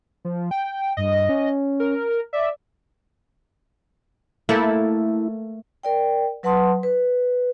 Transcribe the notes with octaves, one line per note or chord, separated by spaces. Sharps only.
F3
G5
G2 D#5
C#4
A#4
D5 E5
A3 A#3 E4 A4
A#4 D5 G5
F#3 B4 F#5 A5 C6 D#6
B4